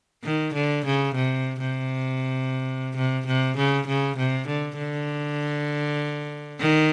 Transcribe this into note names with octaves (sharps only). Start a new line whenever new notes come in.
D#3
D3
C#3
C3
C3
C3
C3
C#3
C#3
C3
D3
D3
D#3